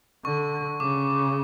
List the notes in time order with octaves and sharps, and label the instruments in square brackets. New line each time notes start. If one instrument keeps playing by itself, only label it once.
[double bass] D3 [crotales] C#6
[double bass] C#3 [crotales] D6